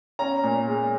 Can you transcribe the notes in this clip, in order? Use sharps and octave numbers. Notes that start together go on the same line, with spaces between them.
C#4 A#5
A#2
G#3